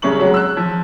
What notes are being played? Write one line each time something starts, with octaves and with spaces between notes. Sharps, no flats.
C2 C#3 C#6 F#7
F#3 G#3
E6 F#6
F3